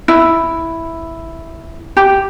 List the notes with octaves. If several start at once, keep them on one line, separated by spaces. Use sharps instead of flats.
E4
G4